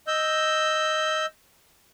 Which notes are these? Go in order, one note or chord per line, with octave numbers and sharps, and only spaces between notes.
D#5 E6 G6